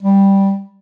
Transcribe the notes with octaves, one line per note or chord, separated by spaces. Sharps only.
G3